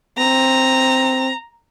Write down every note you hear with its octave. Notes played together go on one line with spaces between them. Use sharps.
C4 A#5